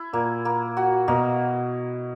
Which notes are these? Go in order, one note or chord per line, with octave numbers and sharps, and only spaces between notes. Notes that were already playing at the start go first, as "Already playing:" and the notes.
Already playing: E4
A#2 A#3
A#3
F#4
B2 A#3